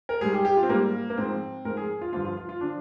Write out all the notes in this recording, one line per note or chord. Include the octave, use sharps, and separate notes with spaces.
A#4
G#2 G3 G#4
G4
G4
F4
C4
G#2 G3 A#3
A#3
G#2 F3 C4
G#2 F3 A#4
G#4
F4
G2 D3 F3 F4
F4
F4
F4
D3 F3 D4